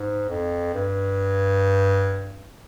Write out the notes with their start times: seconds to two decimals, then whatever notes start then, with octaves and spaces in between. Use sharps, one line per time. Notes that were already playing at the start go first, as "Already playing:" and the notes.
Already playing: G#2
0.29 F2
0.74 G2